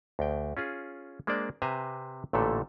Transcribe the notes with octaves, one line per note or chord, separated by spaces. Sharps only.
D2 G5
C#4 F4 G#4
G#3 A#3 D4 C5 D5
C3 B4 C5 G#5 A#5
A1 A#2 D3 A3 A4